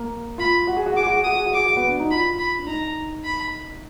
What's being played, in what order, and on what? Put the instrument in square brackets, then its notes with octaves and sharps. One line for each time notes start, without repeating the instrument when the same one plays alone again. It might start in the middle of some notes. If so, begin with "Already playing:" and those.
Already playing: [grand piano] A#3
[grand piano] F4 [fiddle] B5
[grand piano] F#4
G#4
F#4
[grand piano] G#4 [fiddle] D6
[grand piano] F#4
G#4
[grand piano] F#4 [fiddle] D#6
[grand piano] G#4
F#4
[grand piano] G#4 [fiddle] D6
[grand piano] F#4
B3
D4
D#4
[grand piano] F4 [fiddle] B5
[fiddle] B5
[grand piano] D4
[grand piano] D#4 [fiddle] A#5
[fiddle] B5